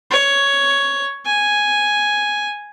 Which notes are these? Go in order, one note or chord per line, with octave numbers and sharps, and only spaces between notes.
C#5
G#5